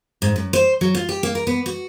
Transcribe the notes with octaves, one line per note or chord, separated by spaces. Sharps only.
G#2
F#2
C5
F#3
F4
G4
A#3
A#4
B3
F#4